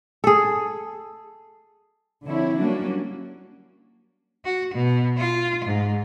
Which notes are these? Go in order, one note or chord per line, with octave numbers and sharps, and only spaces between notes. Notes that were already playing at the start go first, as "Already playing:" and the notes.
G#4 A4
D3 F3 C4 E4 C#5
F#3 G3 A#3 C#4 D4 F#4
F#4
B2
F4
G#2